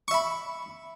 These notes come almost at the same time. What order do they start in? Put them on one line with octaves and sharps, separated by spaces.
C#6 E5 B5